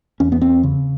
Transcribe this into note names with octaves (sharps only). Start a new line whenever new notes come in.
E2 C#4
B3
C4
C#3